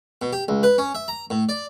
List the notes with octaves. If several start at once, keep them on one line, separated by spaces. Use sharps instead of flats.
B2
G4
C#2
B4
C#4
E5
A#5
A2
D5